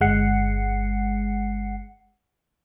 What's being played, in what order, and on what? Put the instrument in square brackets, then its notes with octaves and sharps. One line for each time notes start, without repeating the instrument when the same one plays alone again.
[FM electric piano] G1 G#3 F#5 C7 C#7